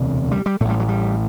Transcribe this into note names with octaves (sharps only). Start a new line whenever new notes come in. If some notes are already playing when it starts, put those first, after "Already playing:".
Already playing: E1 D2 C3
G3
G3
A1 A2 G3 A3
F#3
G3